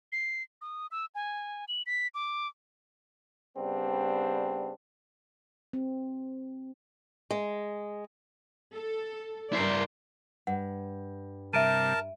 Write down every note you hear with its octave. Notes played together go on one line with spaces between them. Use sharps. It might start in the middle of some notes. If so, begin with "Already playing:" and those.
C7
D#6
E6
G#5
F#7
B6
D6
C#3 G3 B3 C4 D4
C4
G#3
A4
G2 E4 A#4 C5 D5
G2 F#5
C3 G3 A#4 E5 A5 D7 D#7